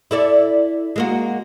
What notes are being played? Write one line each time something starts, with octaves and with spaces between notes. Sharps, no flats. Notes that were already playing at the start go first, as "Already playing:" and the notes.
E4 A4 D5
G#3 A#3 F#4